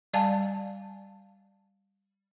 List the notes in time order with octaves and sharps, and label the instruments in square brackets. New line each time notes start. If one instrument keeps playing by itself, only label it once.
[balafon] G3 D5 F5 G#5 A5